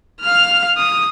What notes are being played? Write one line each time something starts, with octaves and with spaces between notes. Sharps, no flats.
F5 F6
D#6